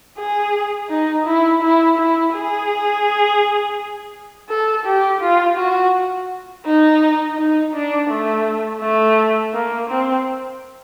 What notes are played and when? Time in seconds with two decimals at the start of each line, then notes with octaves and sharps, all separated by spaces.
0.18 G#4
0.90 D#4
1.26 E4
1.62 E4
1.98 E4
2.34 G#4
4.49 A4
4.86 G4
5.21 F4
5.58 F#4
6.66 D#4
7.37 D#4
7.74 D4
8.10 A3
8.82 A3
9.53 A#3
9.90 C4